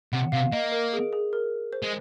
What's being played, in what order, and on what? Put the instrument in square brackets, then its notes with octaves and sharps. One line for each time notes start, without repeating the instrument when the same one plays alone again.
[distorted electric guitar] C3 [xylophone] F#5
[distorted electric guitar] C3 [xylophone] F5
[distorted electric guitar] A#3 [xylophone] D#5
[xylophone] A#4
G#4
G#4
A#4
C5
[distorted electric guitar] G#3